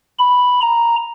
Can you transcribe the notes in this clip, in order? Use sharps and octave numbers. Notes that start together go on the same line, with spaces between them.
B5
A#5